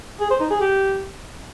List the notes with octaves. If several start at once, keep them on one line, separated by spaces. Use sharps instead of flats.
G#4
C5
D#4
G#4
G4